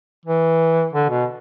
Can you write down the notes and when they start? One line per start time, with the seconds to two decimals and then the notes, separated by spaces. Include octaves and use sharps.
0.26 E3
0.93 D3
1.10 B2